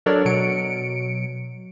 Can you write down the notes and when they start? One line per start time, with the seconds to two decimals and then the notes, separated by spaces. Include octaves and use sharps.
0.06 F#3 D4 A4 A#4 C#5 D5
0.25 B2 F#3 C#7 D7